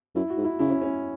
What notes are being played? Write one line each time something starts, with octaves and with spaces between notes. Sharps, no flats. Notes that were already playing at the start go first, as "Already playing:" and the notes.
F#2 E4
F#4
G#2
E4
C#3 E4
C#4
C#4